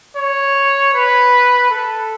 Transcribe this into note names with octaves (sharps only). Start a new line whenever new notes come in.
C#5
B4
A4